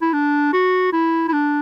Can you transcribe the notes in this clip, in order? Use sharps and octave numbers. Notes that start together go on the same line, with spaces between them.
E4
D4
F#4
E4
E4
D4